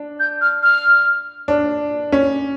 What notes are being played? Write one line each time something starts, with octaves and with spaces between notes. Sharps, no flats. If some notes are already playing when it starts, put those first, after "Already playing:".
Already playing: D4
G6
F6
F6
D4
C#4